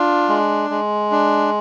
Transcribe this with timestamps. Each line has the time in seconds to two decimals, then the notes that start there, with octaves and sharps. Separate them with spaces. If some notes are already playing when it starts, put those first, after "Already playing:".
Already playing: D4 F4
0.28 G#3
0.70 G#3
1.11 D4